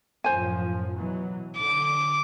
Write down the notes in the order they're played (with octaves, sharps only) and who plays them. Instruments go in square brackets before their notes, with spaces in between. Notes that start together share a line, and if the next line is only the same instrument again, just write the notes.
[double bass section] F#2 A2 F3 [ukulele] C5 G#5
[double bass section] B2 E3 F#3
[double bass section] D3 [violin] D6